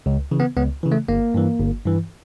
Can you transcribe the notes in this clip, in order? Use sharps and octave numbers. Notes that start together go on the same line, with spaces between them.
C#2
C#3 E3
B3
C#2 B3
C#3 E3
A3
G1 A#3
G2 E3
G1
G2 E3